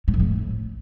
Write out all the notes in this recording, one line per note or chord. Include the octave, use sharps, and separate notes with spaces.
A2
F2
A2